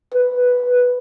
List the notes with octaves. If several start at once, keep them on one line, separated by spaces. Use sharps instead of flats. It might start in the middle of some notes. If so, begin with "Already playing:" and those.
B4